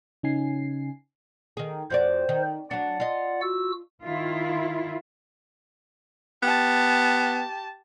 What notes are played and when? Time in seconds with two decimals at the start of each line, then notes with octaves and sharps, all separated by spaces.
0.23 C#3 C#4 D#4 G#5 C7
1.57 D#3 G#4
1.90 F2 F#4 C5 D5
2.29 D#3
2.71 F#3 D4 D5 F#5
3.00 F4 D#5
3.41 F#4 E6
4.04 D#3 E4 F4
6.43 B3 G4 A5